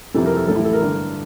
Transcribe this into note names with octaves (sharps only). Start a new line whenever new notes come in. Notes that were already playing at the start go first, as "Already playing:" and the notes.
F2 C3 E3 G3 A4
A#4
A4
A1 A2 G3 A4
E4
A4
A#4
G2 D3 A3